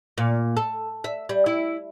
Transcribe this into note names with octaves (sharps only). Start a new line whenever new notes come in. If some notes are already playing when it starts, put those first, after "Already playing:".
A#2
A4
E5
G3
E4